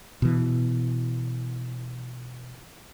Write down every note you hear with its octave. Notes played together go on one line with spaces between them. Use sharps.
B2 E3